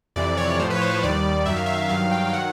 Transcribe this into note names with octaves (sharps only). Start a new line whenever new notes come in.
F2 C3 E3 D5
C#5
A2 F3 C5
B4
C#5
C5
C#5
D#2 D#3 G3 D5
F#2 D#3 F#3 E5
F5
E5
E5
G2 D#3 F#3 F5
G5
G5
D#3 F#3 F#5